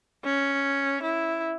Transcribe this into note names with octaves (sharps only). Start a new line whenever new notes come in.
C#4
E4